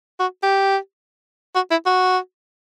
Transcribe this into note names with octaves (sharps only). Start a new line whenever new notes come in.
F#4
G4
F#4
E4
F#4